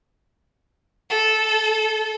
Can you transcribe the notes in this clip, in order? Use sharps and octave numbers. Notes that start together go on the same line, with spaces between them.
A4